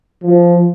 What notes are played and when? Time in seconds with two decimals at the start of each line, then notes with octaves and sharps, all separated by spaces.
0.23 F3